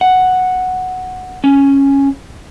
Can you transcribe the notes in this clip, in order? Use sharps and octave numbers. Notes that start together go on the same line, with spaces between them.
F#5
C#4